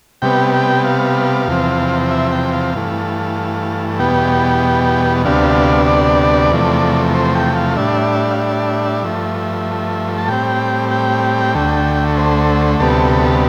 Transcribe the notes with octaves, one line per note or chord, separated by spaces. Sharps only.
C3 G3 B3 G5
G5
F5
E2 C3 F3 C4
E5
G5
F5
G2 E3 A3
E2 B2 G3 B3 G5
D2 C3 G3 B3 D4 F5
D5
E2 C3 F3 A3
C5
G5
F5
A2 G3 D4 E5
F5
E5
G2 F3 A3
A5
A2 G3 C4 G5
G5
D2 D3 A3
C5
D2 C3 G3 B3 A4